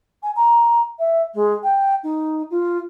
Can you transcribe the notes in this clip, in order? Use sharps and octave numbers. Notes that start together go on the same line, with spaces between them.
G#5
A#5
E5
G#3
G5
D#4
F4